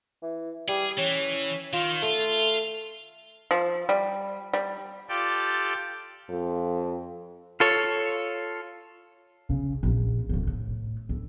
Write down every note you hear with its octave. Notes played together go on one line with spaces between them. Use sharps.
E3
G3 G#4
E3 C#4
D#3 F4
A3 F4
F3
G3
G3
F4 G4 A4 D5 G5
F2
F4 A4 C#5
C#3
A#1
D1 F2
A2
D2